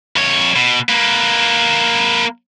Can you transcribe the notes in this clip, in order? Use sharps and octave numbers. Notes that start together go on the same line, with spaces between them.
F2 C#5
B2
A#3 B4